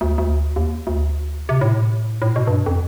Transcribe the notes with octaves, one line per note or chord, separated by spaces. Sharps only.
D2
D2
D#2
D2
C3
A2
A2
B2
G2
F2